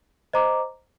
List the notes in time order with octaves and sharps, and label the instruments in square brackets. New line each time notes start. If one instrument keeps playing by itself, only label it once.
[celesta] C5 D#5 A#5 D6